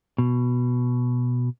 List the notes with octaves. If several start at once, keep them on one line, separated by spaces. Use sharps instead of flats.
B2